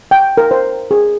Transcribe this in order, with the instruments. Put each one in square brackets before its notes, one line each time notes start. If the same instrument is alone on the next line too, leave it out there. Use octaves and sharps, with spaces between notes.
[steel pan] G5
A#4
C5
G#4